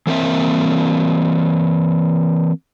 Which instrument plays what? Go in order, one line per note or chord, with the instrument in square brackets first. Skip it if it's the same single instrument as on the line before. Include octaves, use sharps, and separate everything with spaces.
[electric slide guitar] E3 A#3 C4 E5